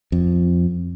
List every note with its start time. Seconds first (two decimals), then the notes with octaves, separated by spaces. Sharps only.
0.12 F2